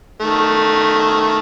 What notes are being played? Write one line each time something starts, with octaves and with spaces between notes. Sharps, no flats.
D#3 A3